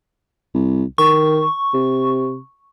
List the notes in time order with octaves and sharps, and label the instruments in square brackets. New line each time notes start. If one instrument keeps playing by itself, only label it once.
[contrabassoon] C2
[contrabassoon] D#3 [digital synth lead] C#6
[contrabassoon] C3